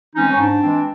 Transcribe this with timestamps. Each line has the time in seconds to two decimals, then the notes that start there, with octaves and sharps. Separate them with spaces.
0.15 E3 G#3 C4 C#4 D#4
0.29 C#4
0.38 G#2 D4
0.62 E3 G#3 C4